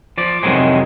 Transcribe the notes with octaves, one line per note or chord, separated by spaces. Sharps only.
F3 D5
C2 F2 C3 D#3 F#3 G#3